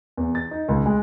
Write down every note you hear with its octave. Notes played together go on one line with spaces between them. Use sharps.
E2
A6
D#4
C#2
G#3